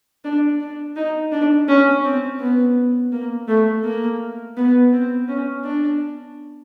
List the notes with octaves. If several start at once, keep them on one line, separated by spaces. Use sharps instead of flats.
D4
D4
D#4
D4
C#4
C4
B3
A#3
A3
A#3
B3
C4
C#4
D4